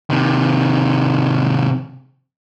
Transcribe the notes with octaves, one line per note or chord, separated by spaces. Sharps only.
C3 D#3